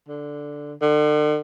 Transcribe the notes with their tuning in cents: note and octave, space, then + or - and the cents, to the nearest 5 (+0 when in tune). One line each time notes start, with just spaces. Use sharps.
D3 +0
D3 +40